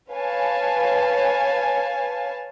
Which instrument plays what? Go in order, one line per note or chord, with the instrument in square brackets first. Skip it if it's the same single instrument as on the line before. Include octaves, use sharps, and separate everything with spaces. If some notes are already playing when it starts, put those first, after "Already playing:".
[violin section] B4 C#5 F5 G#5 A5